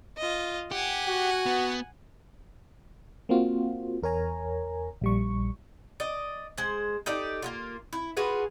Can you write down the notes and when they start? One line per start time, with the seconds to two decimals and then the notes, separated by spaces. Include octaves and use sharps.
0.18 F4 D#5
0.71 G4 F#5 G#5
1.08 F#4
1.46 B3
3.29 A#3 C4 F4 F#4
4.02 E2 A#4 C#5 G#5 A#5
5.01 A#1 G3 C#6
6.00 D5 D#5
6.58 G#3 C5
7.06 D#4 G4 A4 D5
7.42 A#3 B3 F4
7.93 E4
8.17 F4 F#4 G#4 B4